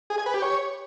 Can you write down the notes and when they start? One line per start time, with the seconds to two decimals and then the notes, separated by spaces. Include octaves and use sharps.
0.10 G#4
0.18 G#5
0.26 B4
0.34 G4
0.42 C#5